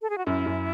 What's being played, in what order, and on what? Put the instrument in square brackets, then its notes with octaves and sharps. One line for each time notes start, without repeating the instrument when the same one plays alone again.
[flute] A4
G#4
F#4
[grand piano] F#2 [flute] E4
[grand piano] F#2